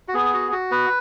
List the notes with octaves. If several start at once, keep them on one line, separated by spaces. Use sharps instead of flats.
F#4
B3 G#4
F#4
F#4
B3 B4